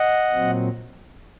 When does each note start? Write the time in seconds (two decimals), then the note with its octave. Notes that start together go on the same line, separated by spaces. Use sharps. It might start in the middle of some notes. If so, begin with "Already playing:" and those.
Already playing: D#5 F#5
0.32 A#2 F#3 C4